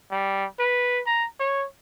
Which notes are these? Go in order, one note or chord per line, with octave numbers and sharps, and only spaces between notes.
G3
B4
A#5
C#5